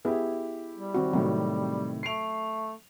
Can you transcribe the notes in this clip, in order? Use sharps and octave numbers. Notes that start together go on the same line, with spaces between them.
B3 E4 G4 G#4 B4
G3
D#3 C4 F#4
A2 C3 D#3 F#3
A3 C7 D7 F7